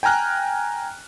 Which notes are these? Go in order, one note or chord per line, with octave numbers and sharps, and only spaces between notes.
G5 G#5 A#5 F6 F#6